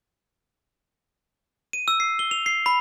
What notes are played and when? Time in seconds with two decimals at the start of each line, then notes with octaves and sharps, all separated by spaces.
1.73 D#7
1.88 E6
2.00 C7
2.19 G7
2.31 F7
2.46 C7
2.66 B5